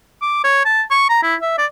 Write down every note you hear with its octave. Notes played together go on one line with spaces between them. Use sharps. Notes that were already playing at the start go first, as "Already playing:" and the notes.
D6
C#5
A5
C#6
A#5
E4
E5
D5